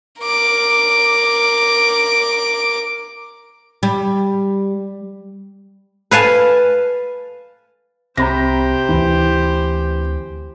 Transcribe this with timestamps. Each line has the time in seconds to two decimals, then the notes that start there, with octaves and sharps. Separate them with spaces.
0.22 A#4 D6
3.83 G3
6.11 B4 F5 G#5 A5
8.17 C2 C3 G4 C5 A#5 B5 A#6
8.89 D2 E3